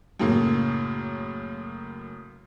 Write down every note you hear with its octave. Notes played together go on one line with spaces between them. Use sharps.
F#2 A2 C#3 A#3